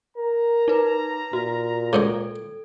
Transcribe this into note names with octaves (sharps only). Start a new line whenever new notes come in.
A#4 A#5
D#4 B4
A#2 F#4
C#2 G#2 C3 A4